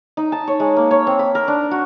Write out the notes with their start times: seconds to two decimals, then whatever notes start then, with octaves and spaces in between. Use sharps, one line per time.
0.17 D#4
0.32 A5
0.47 C#5
0.60 G#3
0.77 A#3
0.91 C#5
1.07 C4
1.19 B5
1.35 A#4
1.48 D4
1.71 F#4